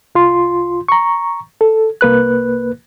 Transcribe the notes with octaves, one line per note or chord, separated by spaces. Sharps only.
C2 F4 C6
A#5 C#6
A4
C2 A#3 B4 F#6